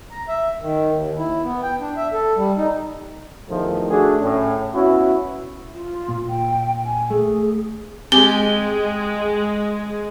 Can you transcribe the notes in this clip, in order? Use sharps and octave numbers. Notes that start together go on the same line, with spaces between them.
A#5
E5
D#3
D#2
E4
B3
G5
D4
E5
A4
G3
D#4
E2 D#3 F3 A3
A3 D4 F#4 G#4
A2 C#4
B3 C#4 E4 F#4
F4
A#2
G5
G#5
A3 G#4
G#3 C4 G4 G#5 G7